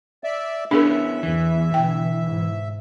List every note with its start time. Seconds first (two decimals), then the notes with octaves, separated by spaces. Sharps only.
0.24 D5 E5
0.71 B3 C#4 D4 E4 G#4 A#4 E5
1.23 E2 E3
1.74 B2 D3 G5
2.23 G#2